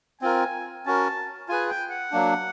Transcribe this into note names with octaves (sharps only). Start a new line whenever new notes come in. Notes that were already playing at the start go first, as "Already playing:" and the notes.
C4 F4 A#4 G#5
C#4 F#4 A#4 A5
F4 G#4 B4 G#5
G5
F#5
F#3 A#3 D4